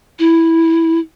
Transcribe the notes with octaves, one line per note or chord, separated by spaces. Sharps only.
E4